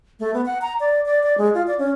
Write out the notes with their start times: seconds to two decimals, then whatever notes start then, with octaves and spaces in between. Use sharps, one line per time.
0.20 A3
0.34 B3
0.46 F#5
0.62 A#5
0.80 D5
1.06 D5
1.23 D5
1.38 G#3
1.54 F4
1.68 D5
1.79 C#4